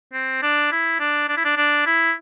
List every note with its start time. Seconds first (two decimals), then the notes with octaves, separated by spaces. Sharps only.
0.13 C4
0.42 D4
0.72 E4
1.00 D4
1.29 D4
1.37 E4
1.45 D4
1.57 D4
1.86 E4